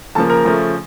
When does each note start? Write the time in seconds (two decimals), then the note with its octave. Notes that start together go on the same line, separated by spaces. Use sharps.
0.15 C#3 F3 A#3 A4 A5
0.30 A#4 A#5
0.45 C#3 F3 A3